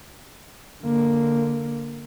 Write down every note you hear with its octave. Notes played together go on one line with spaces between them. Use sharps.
D3 A#3